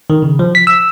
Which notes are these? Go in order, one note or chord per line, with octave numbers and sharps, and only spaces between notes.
D#3
C#3
F3
B6
E6